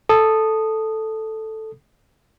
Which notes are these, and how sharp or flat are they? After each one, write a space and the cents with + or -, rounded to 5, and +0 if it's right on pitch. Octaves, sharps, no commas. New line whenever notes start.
A4 +0 D#6 -10